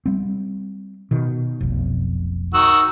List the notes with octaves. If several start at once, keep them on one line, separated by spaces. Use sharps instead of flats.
G3 C4
B2 D#3
F1 B1
D#3 F#4 E6